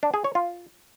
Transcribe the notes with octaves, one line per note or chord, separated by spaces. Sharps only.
D4
G#4
C#5
F4